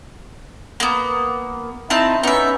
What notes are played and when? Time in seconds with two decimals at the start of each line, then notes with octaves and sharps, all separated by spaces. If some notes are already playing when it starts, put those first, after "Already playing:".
0.80 A#3 B3
1.90 C4 D#4 E4 A5
2.23 B3 C#4 D#4 E5